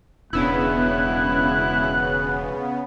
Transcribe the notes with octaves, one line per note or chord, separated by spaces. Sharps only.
E1 C#3 B3 D4 E4 F#6